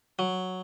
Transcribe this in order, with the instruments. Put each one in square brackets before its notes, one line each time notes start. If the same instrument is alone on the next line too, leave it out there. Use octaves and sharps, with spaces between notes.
[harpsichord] F#3